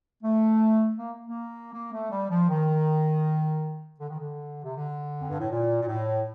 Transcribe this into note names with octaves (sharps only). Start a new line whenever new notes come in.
A3
A#3
A#3
A#3
A3
G3
F3
D#3
D3
D#3
D3
C3
D3
F2
G2
A2
A#2
A#2
A2